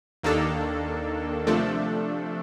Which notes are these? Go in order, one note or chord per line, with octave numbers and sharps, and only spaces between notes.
D#2 D#3 A#3 D4 A4
C3 F3 A3 D4 A4